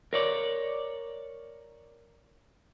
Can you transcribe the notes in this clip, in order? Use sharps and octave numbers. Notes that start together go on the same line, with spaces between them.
A#4 C#5 D5